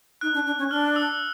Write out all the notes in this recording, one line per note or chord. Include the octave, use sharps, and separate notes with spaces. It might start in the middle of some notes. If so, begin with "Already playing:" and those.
D#4 F#6
D4
D4
C#4
D4 F6
E6